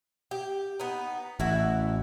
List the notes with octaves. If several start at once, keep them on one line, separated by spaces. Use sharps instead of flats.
G4
B3 D#4
A1 E4 F#4 E5